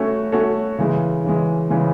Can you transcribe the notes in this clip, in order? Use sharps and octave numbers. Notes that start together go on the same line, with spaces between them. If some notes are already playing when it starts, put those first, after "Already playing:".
Already playing: A3 C#4 F#4 A4 C#5
A3 C#4 F#4 A4 C#5
C#3 E3 G#3
C#3 E3 G#3
C#3 E3 G#3